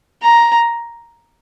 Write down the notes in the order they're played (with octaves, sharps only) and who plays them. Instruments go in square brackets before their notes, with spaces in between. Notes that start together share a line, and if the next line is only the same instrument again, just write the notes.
[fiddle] A#5